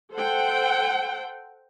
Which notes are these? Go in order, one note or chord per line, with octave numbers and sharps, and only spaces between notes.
A4 C5 F#5 G5